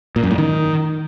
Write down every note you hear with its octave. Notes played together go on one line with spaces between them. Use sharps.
A#2
F#2
A2
D#3